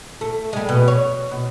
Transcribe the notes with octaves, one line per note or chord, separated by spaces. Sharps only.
A3
G3 G#3
B2
C#5
B2